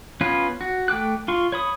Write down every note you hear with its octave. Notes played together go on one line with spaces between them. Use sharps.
B3 C#4 F4 B4
F#4
A3 G5 D6 F#6
F4 C6 C#6
C#5 B5 D#6